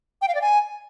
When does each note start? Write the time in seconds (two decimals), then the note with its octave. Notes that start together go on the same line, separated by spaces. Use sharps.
0.22 G5
0.28 F5
0.35 D5
0.41 G#5